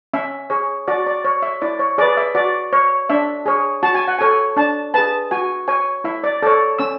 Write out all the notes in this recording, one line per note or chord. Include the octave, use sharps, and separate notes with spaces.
C#4 E5
G#4 C#5
F#4 D5
D5
C#5
E5
E4 D5
C#5
G#4 B4 D5
E5
F#4 D5
C#5
D4 E5
G#4 C#5
F#4 A5
G#5
F#5
A4 C#5 G#5
D4 A5
G#4 B4 A5
F#4 G#5
C#5 G#5
E4 E5
D5
A4 C#5 D5
C#4 E6